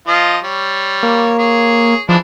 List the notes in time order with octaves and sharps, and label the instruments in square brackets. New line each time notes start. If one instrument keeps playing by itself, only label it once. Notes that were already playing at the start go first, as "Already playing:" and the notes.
[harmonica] F3 F4 D#5
G3 C#5
[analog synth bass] A#3
[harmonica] G#4 C#5
[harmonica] E3 G#3 D4 [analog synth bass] F3